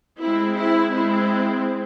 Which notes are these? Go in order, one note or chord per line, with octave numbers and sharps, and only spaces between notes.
G#3 C4 E4
E4
G#3 C4 E4